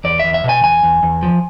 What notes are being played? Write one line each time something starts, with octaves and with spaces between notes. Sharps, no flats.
E2 D5
E2 E5
E5
B2
G#5
E2 G#5
E2
E2
F3